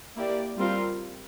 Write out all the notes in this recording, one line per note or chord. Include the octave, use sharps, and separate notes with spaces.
A#3 E4 G4 D5
G3 C4 F4 A#4